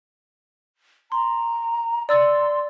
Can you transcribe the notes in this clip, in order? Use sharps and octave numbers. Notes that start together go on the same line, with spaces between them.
A#5 C6
D5 C6 E6 A6